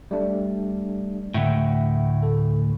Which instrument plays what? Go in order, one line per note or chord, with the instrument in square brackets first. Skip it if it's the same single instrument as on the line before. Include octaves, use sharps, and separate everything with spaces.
[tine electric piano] G3 A3 D4
[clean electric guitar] D2 A2 [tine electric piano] E5 F#5 G5
[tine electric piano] A4